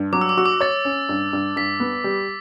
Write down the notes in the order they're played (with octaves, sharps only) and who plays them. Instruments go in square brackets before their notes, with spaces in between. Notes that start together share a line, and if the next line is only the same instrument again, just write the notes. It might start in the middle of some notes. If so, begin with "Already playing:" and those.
Already playing: [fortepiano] G2
[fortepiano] F#3 [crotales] D6
[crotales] E6
D6
[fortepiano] F#4 [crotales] E6
[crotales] D6
[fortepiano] C#5 [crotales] A6
[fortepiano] C#4
G2
G2
[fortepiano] G2 [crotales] B6
[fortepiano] B3
G3